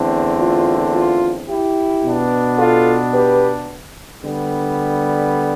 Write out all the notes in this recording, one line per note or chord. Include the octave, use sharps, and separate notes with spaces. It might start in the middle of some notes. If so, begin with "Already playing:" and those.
Already playing: E2 D3 A3 C4
F4
F4
E4 G4
B2 B3 D4
F4 A4
G4 B4
D3 G3 B3